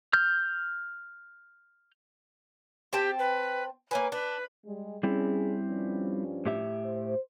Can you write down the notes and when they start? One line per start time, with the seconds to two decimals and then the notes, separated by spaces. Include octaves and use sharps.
0.13 F6 G6
2.93 C4 G4 G5 A5
3.19 B4
3.91 A#3 C#4 B4 G#5
4.12 D4 B4
4.65 G3 G#3
5.03 G3 C4 C#4 E4 G#4
5.66 G2 F3 C#4
6.45 A2 G4 E5
6.86 C5